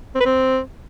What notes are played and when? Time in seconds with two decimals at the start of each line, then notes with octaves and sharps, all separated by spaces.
0.15 C4
0.20 B4
0.26 C4